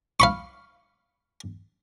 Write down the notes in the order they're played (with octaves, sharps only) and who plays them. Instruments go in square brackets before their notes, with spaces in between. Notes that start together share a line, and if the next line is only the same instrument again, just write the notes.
[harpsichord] F5 B5 C#6